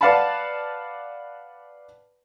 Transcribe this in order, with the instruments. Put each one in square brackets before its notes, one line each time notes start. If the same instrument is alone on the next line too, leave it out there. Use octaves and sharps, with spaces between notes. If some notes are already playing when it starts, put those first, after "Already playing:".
[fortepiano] B4 D5 F5 F#5 A5 B5